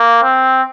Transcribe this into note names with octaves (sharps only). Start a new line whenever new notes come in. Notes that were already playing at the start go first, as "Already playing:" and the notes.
Already playing: A#3
C4